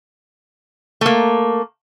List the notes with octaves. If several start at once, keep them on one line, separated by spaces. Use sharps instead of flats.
A3 A#3